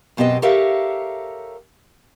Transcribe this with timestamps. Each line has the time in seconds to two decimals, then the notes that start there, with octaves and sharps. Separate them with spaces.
0.17 F#2 B2 C4 G4 D#5
0.42 G4 A4 A#4 C#5 E5 F5